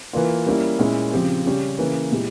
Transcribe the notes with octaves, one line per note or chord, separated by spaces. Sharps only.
E3 A#3 F4
G3 A#3 C#4 E4
A#2 G#3 C#4 E4
C#3 F3 C4 G4
C#3 G3 C#4 G4
C#3 E3 A#3
A#2 G#3 E4 G4